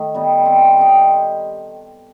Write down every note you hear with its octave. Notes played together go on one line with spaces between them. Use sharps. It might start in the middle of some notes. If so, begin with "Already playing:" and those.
Already playing: D#3 A3
G3 B3 D#4
C4
D#4 G4